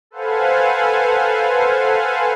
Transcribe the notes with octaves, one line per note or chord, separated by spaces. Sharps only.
A4 B4 C5 F5 F#5 G#5